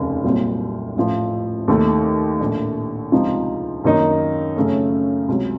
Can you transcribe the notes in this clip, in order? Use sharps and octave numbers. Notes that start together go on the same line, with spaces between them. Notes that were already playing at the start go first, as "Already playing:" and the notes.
Already playing: F1 D#2 C#3
C2 A#2 F#3 C4
A1 A2 F3
D#2 D#3 A3
A#1 A2 A3
C#2 C3 F3 C4 D#4
F#2 D#3 A#3 D#4
F#2 C#3 A3 C#4
C#2 C3 F#3